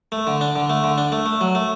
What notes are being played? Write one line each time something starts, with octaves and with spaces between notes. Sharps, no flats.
A3
D3
D4
D3
A3
D3
D4
A3
A3
F#3
A3